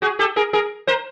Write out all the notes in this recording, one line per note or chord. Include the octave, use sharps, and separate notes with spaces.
F#4 G#4
G4 A4
G#4 A#4
G#4 A#4
A#4 C5